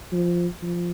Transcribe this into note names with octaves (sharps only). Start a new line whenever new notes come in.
F3
F3